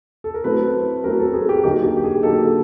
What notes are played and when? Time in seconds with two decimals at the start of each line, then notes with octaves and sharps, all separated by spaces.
0.24 A4
0.34 A#4
0.44 F#3 A3 C4 E4 B4
1.04 F#3 A3 C4 E4 A#4
1.19 A4
1.33 G#4
1.49 G4
1.64 D3 F#3 A#3 D#4 G4
1.83 G4
1.97 G4
2.04 G#4
2.23 D3 F#3 A#3 D#4 A4